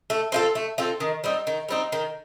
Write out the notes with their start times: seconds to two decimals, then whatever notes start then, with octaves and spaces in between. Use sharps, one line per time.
0.10 A3
0.32 C4 F4 A4
0.55 A3
0.78 C4 F4 A4
1.00 D#3
1.24 G3 C4 D#4
1.47 D#3
1.69 G3 C4 D#4
1.92 D#3